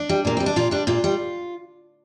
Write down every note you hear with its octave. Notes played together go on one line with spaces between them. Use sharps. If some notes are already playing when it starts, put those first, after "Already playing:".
Already playing: D4
G3
A#2 A#3
G3 C4
D4
A#2 F4
G3 D4
A#2 F4
G3